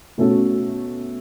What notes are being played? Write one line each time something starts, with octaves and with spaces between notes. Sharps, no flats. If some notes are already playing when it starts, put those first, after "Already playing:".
B2 A3 C#4 F#4 A4